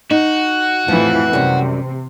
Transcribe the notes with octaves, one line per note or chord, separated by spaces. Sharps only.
D#4 F#4
F2 A2 E3 F3
F#2 C3 G3